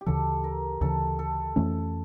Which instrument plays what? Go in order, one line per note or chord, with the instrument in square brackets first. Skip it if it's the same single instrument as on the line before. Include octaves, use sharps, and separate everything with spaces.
[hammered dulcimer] G4
[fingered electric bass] D2 C#3 E3 [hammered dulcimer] A4
[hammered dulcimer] A#4
[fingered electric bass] D2 C#3 E3 [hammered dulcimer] A4
[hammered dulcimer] A4
[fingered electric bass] F2 E3 A3 C#4